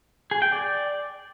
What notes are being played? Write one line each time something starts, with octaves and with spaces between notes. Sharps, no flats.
G#4
G5
D5